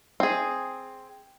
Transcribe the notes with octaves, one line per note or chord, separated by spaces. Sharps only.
C4 G#4